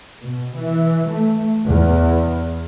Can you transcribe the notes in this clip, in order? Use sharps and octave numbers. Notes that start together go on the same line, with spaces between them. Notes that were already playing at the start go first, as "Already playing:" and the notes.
B2
E3
A3
E2